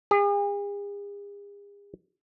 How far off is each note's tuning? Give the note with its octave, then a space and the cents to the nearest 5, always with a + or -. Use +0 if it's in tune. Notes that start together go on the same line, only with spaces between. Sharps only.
G#4 -45